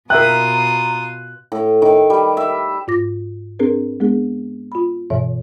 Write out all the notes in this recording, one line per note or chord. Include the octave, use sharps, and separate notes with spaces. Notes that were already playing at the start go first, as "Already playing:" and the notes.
B2 F4 A#4 E5 G5 A#5 D#6 F#6
A2
D#3
G3
E5
G#2 F4 D6 A#6
C4 D4 G#4 A#4 B4
G#3 B3 D4 G#4
F4 B5
G2 B2 E3 C#5 E5